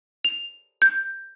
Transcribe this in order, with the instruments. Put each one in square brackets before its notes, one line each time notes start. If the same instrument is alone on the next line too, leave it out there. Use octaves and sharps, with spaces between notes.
[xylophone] F7
G6